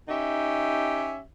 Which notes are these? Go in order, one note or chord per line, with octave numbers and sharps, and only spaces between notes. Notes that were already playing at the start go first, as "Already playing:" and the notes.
C#4 D#4 G4 E5